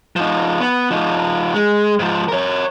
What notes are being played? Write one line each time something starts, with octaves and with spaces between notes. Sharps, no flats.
F3 D#4
B3
F3 D#4
G#3
G#2 F3
A#4 C#5